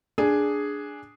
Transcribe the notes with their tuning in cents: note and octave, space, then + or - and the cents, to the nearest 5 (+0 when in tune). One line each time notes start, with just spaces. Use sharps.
D4 +0 G#4 +0